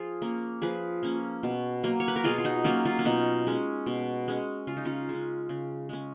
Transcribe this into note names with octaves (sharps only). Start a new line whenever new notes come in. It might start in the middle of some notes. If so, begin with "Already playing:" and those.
Already playing: F3 F4 G#4
A#3 C#4
F3 G#4 B4
A#3 C#4
B2
F#3 A#3
C#5
B4
A#4
B2 F4 G#4
F4
D#4 F#4
F#3 A#3 C#4 F4
C#4 F4
C#4
B2 D#4
G#3 C#4
B2
G#3 C#4
C#3 F4
D#4
C#4 F4
G#3 C#4
C#3
G#3 C#4